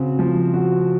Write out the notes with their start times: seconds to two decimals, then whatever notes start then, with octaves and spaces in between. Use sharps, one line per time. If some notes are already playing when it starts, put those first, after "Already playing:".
Already playing: C#3 C4 F#4
0.19 F3
0.54 F#4